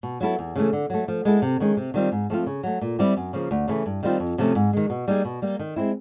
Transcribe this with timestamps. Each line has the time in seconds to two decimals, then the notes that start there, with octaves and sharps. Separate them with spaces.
0.03 B2
0.21 F#3 B3 E4 A4
0.39 E2
0.56 C#3 E3 A3
0.73 D3
0.90 F#3 A3
1.08 F3
1.25 G#3 B3 E4 A4
1.42 C3
1.60 D#3 G#3 C#4
1.77 C3
1.94 D#3 G3 C4 F4
2.12 G#2
2.30 F3 A3 C4 F4
2.46 C#3
2.63 F#3 A3
2.81 A#2
2.99 G3 C4 E4 G4
3.17 F#2
3.33 C#3 F3 A#3
3.51 D2
3.68 C#3 E3 A3
3.86 G2
4.03 D#3 G3 C4 F4
4.20 F2
4.38 C3 F3 A3 C#4
4.55 G#2
4.73 D#3 G#3
4.90 B2
5.08 G3 A#3 D#4 G#4
5.25 B2
5.42 G3 A#3
5.59 D#3
5.76 G#3 C4 E4